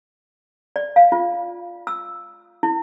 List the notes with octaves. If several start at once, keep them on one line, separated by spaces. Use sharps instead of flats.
D5
F5
F4
E6
E4